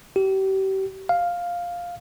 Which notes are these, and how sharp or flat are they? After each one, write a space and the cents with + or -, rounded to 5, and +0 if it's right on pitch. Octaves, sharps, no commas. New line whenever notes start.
G4 -35
F5 +5